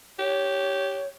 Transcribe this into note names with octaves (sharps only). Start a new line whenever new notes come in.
G4 C#5